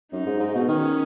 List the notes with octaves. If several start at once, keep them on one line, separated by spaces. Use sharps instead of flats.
F#2 D#4
G#2
G#2
B2
D#3 C#4